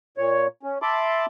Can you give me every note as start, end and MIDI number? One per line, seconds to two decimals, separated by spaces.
0.18 0.47 46
0.18 0.47 73
0.63 0.78 61
0.82 1.26 76
0.82 1.26 81
0.82 1.26 83
0.82 1.26 84
0.82 1.26 86